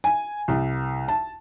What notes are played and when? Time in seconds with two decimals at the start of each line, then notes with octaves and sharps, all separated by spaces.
0.04 G#5
0.48 C2
1.08 A5